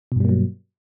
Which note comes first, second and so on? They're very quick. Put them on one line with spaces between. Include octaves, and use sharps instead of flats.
B2 G2 G3 A#3 F#3